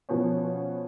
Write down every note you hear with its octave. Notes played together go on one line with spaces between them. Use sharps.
B2 F3 B3 C#4